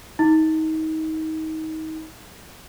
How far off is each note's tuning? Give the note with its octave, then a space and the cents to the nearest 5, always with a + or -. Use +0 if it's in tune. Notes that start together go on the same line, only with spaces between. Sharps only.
D#4 +25